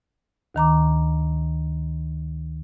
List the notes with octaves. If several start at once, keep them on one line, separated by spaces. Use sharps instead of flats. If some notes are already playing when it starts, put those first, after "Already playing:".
D2 D#3 A#5 D6